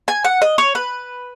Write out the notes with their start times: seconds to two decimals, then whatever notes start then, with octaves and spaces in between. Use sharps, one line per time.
0.08 G#5
0.25 F#5
0.42 D#5
0.58 C#5
0.75 B4